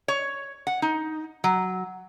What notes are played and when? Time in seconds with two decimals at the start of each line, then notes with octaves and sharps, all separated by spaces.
0.08 C#5
0.67 F#5
0.82 D#4
1.44 F#3